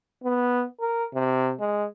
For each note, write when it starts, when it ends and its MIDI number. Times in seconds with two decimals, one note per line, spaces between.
0.24 0.65 59
0.81 1.05 70
1.15 1.53 48
1.60 1.86 56